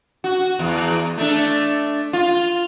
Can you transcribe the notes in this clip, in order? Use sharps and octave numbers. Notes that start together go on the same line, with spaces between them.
F#4
E2
A3 D4
F4